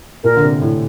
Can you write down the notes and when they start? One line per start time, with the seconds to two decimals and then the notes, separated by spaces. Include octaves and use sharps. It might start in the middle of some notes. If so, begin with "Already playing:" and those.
0.24 A#2 A#4
0.36 D3
0.43 C3
0.61 A2